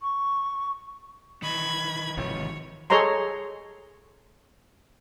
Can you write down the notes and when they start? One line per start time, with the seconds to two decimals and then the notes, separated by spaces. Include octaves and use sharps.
0.02 C#6
1.42 D#3 E3 B5 G#6
2.17 G#1 C3 F3 C#5
2.90 G#4 A4 C#5 D#5 A#5 C6